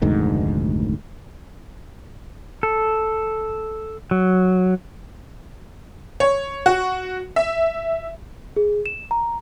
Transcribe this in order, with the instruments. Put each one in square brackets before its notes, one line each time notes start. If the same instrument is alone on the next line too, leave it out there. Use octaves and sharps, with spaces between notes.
[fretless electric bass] F1 D2 G#2 D#3
[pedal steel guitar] A4
F#3
[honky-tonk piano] C#5
F#4
E5
[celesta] G#4
E7
A#5